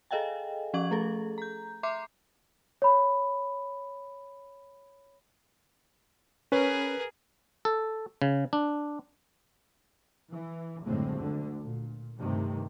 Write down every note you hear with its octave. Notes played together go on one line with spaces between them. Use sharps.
G#4 A4 D#5 F5 G5 G#5
F3 C#4 F5 C#6 G#6 F#7
A3 G#4 A4
A#5 G6
E5 A#5 C6 D6 G6 C7
C#5 B5
C#4 G#4 A#4 B4
A4
C#3
D4
E3
F#1 A2 D3 G#3 A3 C4
D2 D3
A#2
G2 C3 D#3 A3